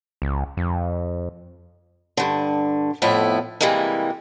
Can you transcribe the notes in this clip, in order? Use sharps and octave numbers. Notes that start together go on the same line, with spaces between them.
C#2
F2
G2 D3
F2 A2 B3 E4
C3 E3 G3 G#3 A#3